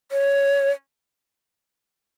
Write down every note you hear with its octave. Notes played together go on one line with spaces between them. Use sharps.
C#5